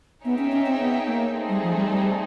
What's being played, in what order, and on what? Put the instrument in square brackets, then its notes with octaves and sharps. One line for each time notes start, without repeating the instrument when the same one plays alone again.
[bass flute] B3 [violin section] D#4 G#4 C#5 E5 G5
[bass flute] C#4
C#4
C4
B3
A#3
[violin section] A3 C4 D#4 G#4
[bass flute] G3
F3
G3
G3